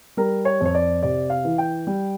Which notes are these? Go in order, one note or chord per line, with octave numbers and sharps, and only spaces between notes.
G3 A#4
C#5
F2 C#5
D5
C3 D5
F5
E3
G5
G3